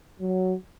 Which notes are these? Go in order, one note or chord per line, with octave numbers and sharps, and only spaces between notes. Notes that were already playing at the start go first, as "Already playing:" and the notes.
F#3